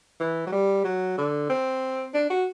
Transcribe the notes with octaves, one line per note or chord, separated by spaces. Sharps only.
E3
F#3
G3
F#3
D3
C4
D4
F#4